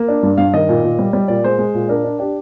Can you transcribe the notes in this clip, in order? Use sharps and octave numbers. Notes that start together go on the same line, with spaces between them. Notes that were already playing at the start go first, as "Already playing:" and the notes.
Already playing: A#3
D4
G2
G2 F5
D#3 D#5
A#2
A#2
G3
G3
A#2 D5
G#3 C5
G#3
A#2
D4 A#4
D4
D4 G4